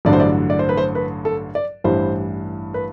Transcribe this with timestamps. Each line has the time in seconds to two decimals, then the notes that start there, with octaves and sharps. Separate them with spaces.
0.05 A1 G2 D3 F#3 D5
0.13 C5
0.20 D5
0.50 D5
0.59 C5
0.69 B4
0.77 C5
0.95 B4
1.25 A4
1.55 D5
1.84 A1 G2 E3 G3 C5
2.74 B4